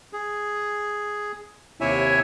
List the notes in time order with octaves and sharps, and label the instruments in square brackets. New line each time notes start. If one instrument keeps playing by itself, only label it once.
[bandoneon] G#4
D#2 C3 E4 C#5 E5 G#5